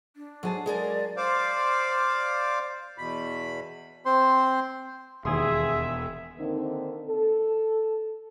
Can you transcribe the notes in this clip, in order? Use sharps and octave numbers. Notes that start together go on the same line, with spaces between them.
D4
G#2 F#3 G#4 A5
G#3 G#4 A#4 D5
C5 D5 F5
E2 B2 B5
C4 C5 C6
E1 D#2 G#4 E5 C6
D3 D#3 A#3 C4 D#4
A4